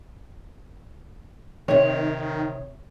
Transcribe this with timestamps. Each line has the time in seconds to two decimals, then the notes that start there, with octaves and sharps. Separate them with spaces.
1.68 C3 D#3 C#5